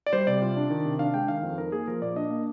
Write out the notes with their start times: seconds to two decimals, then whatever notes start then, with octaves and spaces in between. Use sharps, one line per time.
0.06 D5
0.13 G3 C5
0.27 C3 D5
0.42 F4
0.56 D4
0.70 D#3
0.85 C3
0.99 D4 F5
1.14 G#3 G5
1.28 D#3 F5
1.43 F2
1.58 D#4 A#4
1.72 A#3 G#4
1.87 F3 A#4
2.02 A#2 D5
2.16 D4 D#5
2.30 A#3